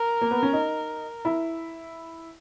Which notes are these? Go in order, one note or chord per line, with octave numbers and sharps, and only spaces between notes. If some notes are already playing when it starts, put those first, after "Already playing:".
Already playing: A#4
A#3
B3
C#4
D#4
E4